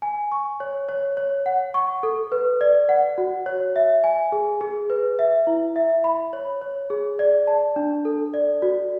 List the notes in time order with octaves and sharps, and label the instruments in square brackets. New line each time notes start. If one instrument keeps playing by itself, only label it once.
[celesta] G#5
C#6
C#5
C#5
C#5
F#5
C#6
A4
B4
D5
F#5
F#4
C#5
E5
G#5
G#4
G#4
B4
E5
E4
E5
B5
C#5
C#5
G#4
D5
A5
D4
A4
D5
F#4